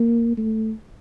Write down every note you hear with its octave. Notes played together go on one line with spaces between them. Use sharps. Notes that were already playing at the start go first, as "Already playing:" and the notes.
Already playing: A#3
A3